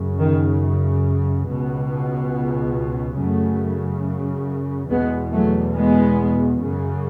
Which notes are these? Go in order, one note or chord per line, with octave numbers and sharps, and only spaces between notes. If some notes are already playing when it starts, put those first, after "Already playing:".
Already playing: F#2 C#3
D#3
C#2 B2
F#2 C#3 F#3 A3
E2 B2 G#3 B3
F#3 A3
G#3 B3
F#2 C#3